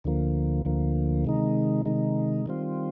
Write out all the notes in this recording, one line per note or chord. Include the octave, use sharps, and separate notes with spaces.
D2 D3 F3 A#3
D2 D3 F3 A#3
C3 D#3 G#3 D#4
C3 D#3 G#3 D#4
D#3 G3 C4 F4